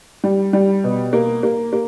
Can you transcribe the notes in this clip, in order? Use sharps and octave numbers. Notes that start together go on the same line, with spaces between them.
G3
G3
B2
A#3
A#3
A#3